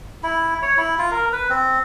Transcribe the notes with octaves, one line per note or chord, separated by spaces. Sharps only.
E4
C#5
E4
F4
A#4
B4
C4